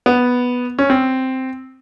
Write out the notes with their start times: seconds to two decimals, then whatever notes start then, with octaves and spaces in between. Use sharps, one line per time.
0.06 B3
0.79 C#4
0.90 C4